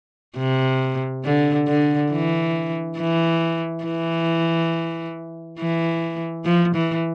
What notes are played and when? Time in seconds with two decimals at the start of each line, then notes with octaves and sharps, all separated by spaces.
0.38 C3
1.25 D3
1.68 D3
2.12 E3
2.99 E3
3.85 E3
5.59 E3
6.45 F3
6.75 E3